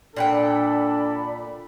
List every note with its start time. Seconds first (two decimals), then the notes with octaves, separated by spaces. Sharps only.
0.16 A#2 D4 A4 D5 F#5 G5 B5